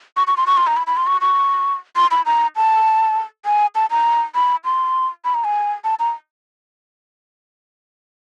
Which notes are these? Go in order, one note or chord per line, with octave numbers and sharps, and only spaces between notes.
C#6
C#6
C6
C#6
C6
A#5
B5
B5
C6
C#6
C#6
C6
B5
A#5
A5
G#5
A5
A#5
B5
C6
B5
A#5
G#5
A5
A#5